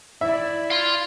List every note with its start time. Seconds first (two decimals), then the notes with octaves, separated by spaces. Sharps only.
0.21 E4 D5 E5
0.70 F5 C6